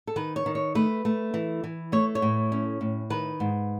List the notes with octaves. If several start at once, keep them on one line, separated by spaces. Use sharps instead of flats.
A4
D#3 B4
C#5
D#3
C#5
A3 B4
A3
E3
E3
A3 C#5
C#5
A2
C#4
A2
D#3 B4
G#2